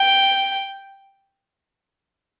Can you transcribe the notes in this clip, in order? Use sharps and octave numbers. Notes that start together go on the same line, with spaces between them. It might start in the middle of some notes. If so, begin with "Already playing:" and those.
Already playing: G5